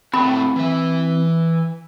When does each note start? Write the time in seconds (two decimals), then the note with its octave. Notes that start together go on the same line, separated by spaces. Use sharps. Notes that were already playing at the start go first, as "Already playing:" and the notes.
0.14 A2 A3 C4 F#4 B5
0.56 E3 E5